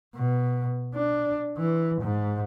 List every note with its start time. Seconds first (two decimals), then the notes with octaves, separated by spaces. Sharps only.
0.16 B2
0.95 D4
1.58 E3
2.01 G#2